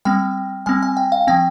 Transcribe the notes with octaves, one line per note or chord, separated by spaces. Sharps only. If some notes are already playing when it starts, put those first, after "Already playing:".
G3 C4 G5
G3 C4 G#5
G#5
G5
F5
F3 C4 G5